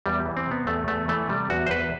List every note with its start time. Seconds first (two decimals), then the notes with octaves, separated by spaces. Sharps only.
0.06 E2 G3
0.26 E3
0.37 C4
0.47 C3 B3
0.67 E2 A3
0.88 E2 A3
1.08 E3 A3
1.29 C3 G3
1.50 E2 F#4
1.66 C5
1.70 E2 B4